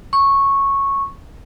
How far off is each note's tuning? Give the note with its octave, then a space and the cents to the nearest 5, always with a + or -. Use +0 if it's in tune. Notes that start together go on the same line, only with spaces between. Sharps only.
C#6 -10